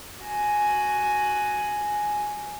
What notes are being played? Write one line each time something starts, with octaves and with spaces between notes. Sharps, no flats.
F#4 G#5